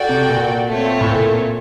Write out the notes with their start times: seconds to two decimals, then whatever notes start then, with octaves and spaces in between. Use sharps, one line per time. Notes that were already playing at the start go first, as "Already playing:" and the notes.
Already playing: F#4 A4 D5 G5
0.09 C3
0.29 A#2
0.70 A3 C4 F4 A4 C#5
1.01 A2
1.11 A#2